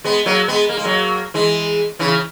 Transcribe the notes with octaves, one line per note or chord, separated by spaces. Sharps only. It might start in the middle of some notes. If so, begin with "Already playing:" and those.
G#3 B3
F#3 A#3
G#3 B3
A#3
G#3
F#3 A#3
E3 G#3
C#3 E3